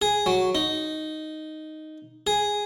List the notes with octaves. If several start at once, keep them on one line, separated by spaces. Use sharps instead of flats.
G#4
F#3
D#4
G#4